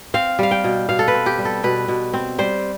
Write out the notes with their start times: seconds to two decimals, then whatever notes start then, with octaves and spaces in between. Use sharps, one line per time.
0.14 C4 F5
0.39 G3 F5
0.51 G5
0.64 B2
0.89 B2 F5
0.99 A4
1.08 B4
1.14 C4
1.26 G4
1.39 G3
1.45 A4
1.63 B2 B4
1.88 B2
2.14 C4
2.38 G3 C5